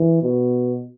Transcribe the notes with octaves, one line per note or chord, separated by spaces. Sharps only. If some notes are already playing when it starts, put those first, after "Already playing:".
Already playing: E3
B2